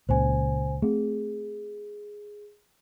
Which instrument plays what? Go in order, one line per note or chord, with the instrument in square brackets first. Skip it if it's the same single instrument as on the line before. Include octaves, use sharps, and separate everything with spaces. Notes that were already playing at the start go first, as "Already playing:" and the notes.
[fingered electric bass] C#2 A#2 C#3 [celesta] C5 G#5
[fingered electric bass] A3 C4 [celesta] G#4